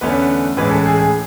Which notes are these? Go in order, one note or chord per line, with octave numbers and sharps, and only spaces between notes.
E2 D3 A3 C#4 B4
A2 E3 G#3 C#4 B4
A4
G#4
G#4